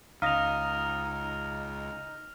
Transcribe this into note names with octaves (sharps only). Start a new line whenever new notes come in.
C#2 D#4 F5 D#6 F6 A#6 F7